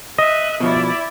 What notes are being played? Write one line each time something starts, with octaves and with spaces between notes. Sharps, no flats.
D#5 E5 D#6 F#6
B2 F3 E4 D5 E5